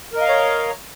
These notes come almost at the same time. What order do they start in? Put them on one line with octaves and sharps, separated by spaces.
A#4 D#5 F5 A#5 C#5